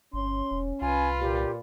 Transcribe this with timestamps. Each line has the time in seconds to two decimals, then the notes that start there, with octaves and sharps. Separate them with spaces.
0.13 G1 C#4 C6
0.51 E1
0.82 C2 F4 B4 G#5
1.20 A#2 G4